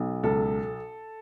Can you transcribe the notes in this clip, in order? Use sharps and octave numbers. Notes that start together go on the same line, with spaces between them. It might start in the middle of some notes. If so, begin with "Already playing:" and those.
Already playing: B1
C#2 A4